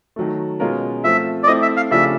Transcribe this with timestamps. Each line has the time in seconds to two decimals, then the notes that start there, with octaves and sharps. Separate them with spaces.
0.16 D#3 F#3 A3
0.60 B2 G#3 C#4 F4 A#4
1.04 F3 A3 C4 E5
1.43 D5
1.47 A3 C4 E4 D#5
1.62 E5
1.77 F5
1.90 C#3 F3 A3 D4 G4 E5